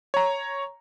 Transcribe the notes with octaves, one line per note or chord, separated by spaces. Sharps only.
C#5 A#5